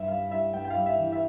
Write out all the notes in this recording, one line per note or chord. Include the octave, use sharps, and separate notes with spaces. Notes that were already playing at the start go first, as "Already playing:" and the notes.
Already playing: G2 E5
G3 F5
G3 E5
G2 G5
G5
G3 F5
E5
E3
E5